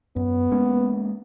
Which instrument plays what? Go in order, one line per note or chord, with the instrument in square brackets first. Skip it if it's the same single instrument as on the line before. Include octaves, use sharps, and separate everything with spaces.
[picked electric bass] F#2 [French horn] B3
[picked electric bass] G#3 A#3 C#4